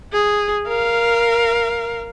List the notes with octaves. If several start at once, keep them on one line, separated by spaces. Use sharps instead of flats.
G#4
A#4 F5